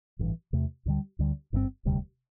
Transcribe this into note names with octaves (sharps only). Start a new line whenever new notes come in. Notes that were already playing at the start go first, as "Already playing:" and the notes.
A1 G2 E3
E2 C3 A3
D2 D3 G3
D2 D3 G3
G1 G2 D3 C4
E1 D2 C3 G3